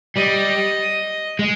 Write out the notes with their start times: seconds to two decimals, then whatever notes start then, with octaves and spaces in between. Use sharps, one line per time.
0.17 G3 D#5
1.39 G#3